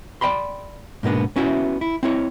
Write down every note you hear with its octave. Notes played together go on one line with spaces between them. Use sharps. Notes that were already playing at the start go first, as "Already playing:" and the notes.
D5 D#5 G5 B5 C6
G#2 B2 A#3 B3 D4
B3 C#4 E4 F#4 E5
E4
C4 E4 C#5